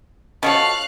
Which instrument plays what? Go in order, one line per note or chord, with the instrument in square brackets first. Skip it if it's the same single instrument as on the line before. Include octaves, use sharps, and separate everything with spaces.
[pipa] B2 F3 A4 [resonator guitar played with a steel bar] C#4 C#5 [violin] F5 F#6